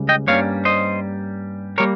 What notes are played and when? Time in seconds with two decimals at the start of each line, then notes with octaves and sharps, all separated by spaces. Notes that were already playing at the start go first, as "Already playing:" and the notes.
Already playing: C#2 C#3 G3
0.09 D#5 G5
0.27 G2 G3 A#3 C#4 C#5 F5
0.65 C5 D#5
1.78 G3 A#3 A#4 C#5